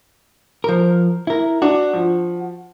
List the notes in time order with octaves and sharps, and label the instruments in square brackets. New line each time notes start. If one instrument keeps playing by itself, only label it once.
[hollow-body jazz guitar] F3 A#4
E4 A#4
[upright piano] D4 [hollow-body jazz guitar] F#4
[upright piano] F3